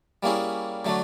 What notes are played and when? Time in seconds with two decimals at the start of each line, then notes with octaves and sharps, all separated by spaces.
0.23 G3 A#3 C#4 E4 G#4
0.85 D3 F#3 A3 D4